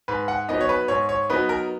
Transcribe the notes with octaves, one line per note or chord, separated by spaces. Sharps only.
G#2 B4
F#5
F#3 B3 D#4 D#5
C#5
B4
G#2 C#5
C#5
F#3 B3 D#4 B4
A#4